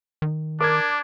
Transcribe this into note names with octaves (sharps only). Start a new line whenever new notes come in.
D#3
D4 A#4 D6 G#6